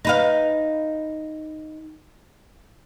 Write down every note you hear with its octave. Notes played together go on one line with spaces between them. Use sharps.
D#4 B4 F5